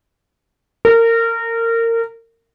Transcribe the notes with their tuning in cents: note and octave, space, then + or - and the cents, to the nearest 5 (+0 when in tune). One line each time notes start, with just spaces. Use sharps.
A#4 -25